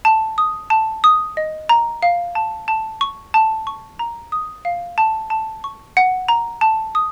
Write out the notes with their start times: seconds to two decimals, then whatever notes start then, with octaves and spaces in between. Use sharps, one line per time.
0.05 A5
0.38 D#6
0.70 A5
1.04 D#6
1.37 D#5
1.69 A#5
2.02 F5
2.35 A5
2.68 A5
3.01 C#6
3.34 A5
3.67 C#6
3.99 A#5
4.32 D#6
4.65 F5
4.98 A5
5.30 A5
5.64 C#6
5.97 F#5
6.28 A#5
6.61 A5
6.95 D#6